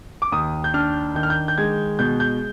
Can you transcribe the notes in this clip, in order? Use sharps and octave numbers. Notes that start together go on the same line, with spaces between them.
D6
D#2 D#6
G6
D4 F6
D#3 G6
F6
G6
G6
G#3 G#6
B2 G6
G6